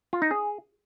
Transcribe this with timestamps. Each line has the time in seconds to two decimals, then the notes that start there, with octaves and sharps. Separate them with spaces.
0.13 F4
0.22 D#4
0.31 G#4